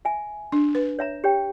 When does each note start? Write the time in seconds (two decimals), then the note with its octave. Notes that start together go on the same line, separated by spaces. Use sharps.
0.05 E5 G#5
0.52 D4
0.75 B4
0.99 C#5 E5 A#5
1.24 G4 C#5 G5